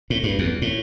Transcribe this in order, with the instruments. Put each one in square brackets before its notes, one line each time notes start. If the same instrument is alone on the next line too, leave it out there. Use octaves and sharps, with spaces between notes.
[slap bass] A2
G2
E2
A2